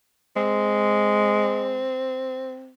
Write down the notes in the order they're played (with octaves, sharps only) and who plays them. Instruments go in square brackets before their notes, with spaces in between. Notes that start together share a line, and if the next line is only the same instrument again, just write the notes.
[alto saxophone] G#3 [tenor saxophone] C4